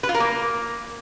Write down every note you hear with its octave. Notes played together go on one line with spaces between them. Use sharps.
B4
F4
A#4
A#3